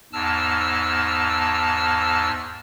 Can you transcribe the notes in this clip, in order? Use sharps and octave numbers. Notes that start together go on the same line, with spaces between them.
E2 G#2 A5 E6 F6